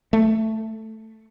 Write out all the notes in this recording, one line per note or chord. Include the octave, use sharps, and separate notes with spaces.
A3